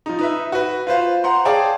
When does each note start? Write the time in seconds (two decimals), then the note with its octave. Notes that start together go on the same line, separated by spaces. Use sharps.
0.06 F3 D#4
0.19 D#4 B4 E5
0.52 F#4 B4
0.87 F4 B4 C5 F5
1.24 C5 F#5 A#5 C6
1.45 G#4 C#5 D5 F5 G5 A5